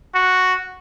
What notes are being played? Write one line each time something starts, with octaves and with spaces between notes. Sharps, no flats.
F#4